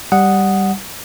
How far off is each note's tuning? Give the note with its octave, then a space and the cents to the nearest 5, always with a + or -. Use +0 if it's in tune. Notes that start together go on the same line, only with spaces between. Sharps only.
G3 -5 F#5 +0 D#6 +0